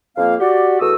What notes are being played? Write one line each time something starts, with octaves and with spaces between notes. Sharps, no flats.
F2 A#3 F5
F#4 G4 D5
E2 A3 F#4 D#6 E6